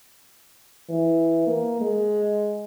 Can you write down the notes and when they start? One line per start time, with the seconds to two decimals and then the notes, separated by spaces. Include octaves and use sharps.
0.89 E3
1.47 A#3
1.81 G#3